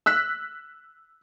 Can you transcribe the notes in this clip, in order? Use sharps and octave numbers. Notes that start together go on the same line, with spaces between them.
E6 F#6 B6